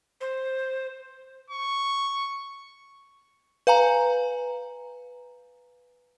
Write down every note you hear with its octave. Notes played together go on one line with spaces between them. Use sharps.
C5
C#6
B4 F5 G#5 A#5